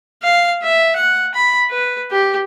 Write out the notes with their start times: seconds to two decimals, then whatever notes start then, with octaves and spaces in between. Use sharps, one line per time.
0.23 F5
0.63 E5
0.96 F#5
1.34 B5
1.70 B4
2.12 G4